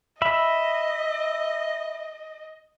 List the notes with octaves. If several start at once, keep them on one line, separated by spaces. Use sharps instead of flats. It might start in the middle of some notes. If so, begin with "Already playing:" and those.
D#5 E5 B5